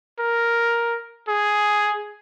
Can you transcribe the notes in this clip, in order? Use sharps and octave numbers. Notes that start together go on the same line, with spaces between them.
A#4
G#4